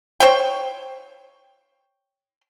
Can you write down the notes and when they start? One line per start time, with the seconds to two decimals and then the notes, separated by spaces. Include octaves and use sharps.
0.20 C5 C#5 G5